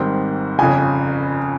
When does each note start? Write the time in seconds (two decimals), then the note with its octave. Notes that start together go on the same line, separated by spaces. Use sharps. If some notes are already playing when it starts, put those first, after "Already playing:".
Already playing: G#1 G#2 D#3 G3 C4
0.59 G1 F2 C#3 G#5